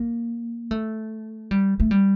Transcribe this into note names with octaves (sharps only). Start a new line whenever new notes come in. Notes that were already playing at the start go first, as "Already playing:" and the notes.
Already playing: A#3
A3
G3
A3
G3